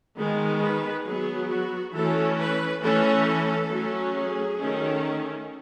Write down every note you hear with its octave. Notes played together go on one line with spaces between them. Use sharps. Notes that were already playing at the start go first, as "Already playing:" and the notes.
D#3 G#3 B3
B4
F#3 B3 G#4
F#4
E3 A3 C#4 A4
B4
E3 A3 C#4 A4
A4
F#3 A3 C#4
G#4
D#3 A3 C#4